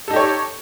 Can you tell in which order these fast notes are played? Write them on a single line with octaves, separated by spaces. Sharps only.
A4 D#4 G4 C#5